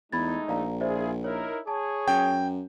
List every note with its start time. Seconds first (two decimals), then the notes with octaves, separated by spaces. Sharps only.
0.12 E2 G#3 A3 D#4 B5 G#6 A6
0.48 A#1 D5 F5 A#5
0.81 E4 F4 G#4 C5 D5 E5
1.24 D#4 E4 A#4 C#5
1.67 G#4 C#5 A5
2.08 F#2 G5